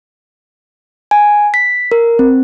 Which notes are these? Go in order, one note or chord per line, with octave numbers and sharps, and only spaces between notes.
G#5
B6
A#4
C4